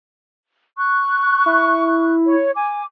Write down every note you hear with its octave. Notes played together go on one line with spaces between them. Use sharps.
C#6 F#6
E4
C#5
G#5 D6